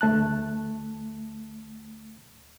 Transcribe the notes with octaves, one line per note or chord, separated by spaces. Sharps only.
D2 A3 A5 F#6